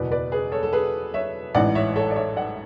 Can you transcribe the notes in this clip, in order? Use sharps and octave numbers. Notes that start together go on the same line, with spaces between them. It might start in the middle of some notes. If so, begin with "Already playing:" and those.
Already playing: F#1 E2 B2 B4 D5
B4 D5
G#4 B4
A4 C#5
A4
G#4 B4
C#5 E5
A1 G#2 E3 D5 F#5
C#5 E5
A4 C#5
D5
C#5 E5
D5 F#5